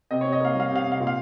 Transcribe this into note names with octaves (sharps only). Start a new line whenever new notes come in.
C3 D#5
C3 C#5
D#5
A#3 F5
G3 F5
C3 F5
C3
F5
A#2
F5